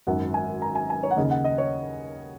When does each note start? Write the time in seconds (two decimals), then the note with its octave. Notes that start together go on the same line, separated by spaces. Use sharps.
0.07 G#1 F#2 D#3 F#5
0.34 G#5
0.62 A#5
0.75 G#5
0.90 G#5
1.03 C#5
1.11 F#5
1.16 D#2 C#3 D#5
1.30 F#5
1.44 D#5
1.58 C#5